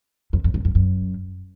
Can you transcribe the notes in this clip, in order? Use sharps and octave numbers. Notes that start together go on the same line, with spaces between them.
F2
F2
F#2
F#2
F#2